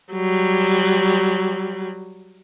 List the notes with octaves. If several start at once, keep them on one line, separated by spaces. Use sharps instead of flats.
F#3 G3